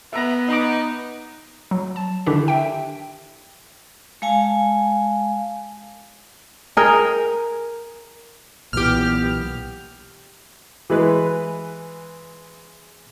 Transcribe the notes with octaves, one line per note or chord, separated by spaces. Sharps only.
B3 E5 A#5
D#4 D#5 A#5 D6
F#3
A5
D3 D#3 D4 E4 G4
E5 G5
G#3 F5 G#5 A5
G#4 A#4 G5
B1 A#2 E3 B3 G4 F6
E3 G#3 B4